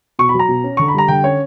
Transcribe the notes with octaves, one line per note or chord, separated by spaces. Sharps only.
B2 C#6
B5
F#3
A#5
B2
C#4
D3 C#6
B5
G3 A#5
D3 G5
C#4 C#5